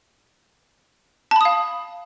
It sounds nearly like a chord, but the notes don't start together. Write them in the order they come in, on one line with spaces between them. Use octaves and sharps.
A5 B5 D#6 F5